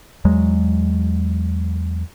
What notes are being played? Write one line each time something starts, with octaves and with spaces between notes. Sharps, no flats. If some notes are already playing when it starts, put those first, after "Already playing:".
E2 F#3 G#3